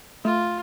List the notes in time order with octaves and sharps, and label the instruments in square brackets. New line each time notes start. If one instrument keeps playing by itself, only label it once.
[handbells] A3 [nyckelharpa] F4